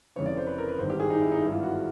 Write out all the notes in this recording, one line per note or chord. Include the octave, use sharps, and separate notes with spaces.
F1 F2 C#3 E3 C#5
D5
C5
B4
A#4
B4
G#1 G2 D#3 C5
G4
G#4
D#4
E4
D#4
G#1 G2 E3 E4
F4
F#4